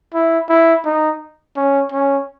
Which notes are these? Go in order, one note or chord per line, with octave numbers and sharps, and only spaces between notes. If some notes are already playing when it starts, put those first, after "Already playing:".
E4
E4
D#4
C#4
C#4